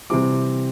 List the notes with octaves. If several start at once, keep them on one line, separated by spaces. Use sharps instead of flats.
C3 E3 G3 C4 D6